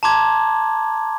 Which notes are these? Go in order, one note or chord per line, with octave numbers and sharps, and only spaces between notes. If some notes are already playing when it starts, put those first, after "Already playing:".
A5 A#5 C6 D6 G#6